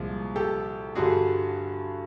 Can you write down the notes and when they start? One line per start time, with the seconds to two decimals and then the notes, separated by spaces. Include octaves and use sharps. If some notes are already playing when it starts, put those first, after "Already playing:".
Already playing: C2 A#2 F3 G#3
0.36 G4 A4
0.95 G2 D3 G3 F#4 G#4